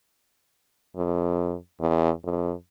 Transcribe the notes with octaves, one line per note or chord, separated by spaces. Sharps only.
F2
E2
F2